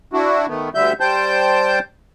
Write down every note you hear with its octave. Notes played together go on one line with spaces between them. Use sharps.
D4 E4 F#4
D#3 A3 B3
D2 D3 G3 E5 G6
G3 C5 G5 A5 G6